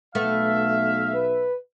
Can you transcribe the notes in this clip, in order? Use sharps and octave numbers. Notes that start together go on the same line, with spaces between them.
B1 A3 B3 E5 F5
B4